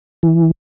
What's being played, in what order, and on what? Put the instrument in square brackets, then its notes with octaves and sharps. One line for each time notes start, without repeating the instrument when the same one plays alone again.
[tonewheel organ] E3